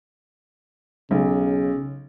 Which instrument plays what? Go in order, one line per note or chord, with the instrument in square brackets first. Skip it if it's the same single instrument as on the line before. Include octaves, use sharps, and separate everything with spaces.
[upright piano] B1 [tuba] C#3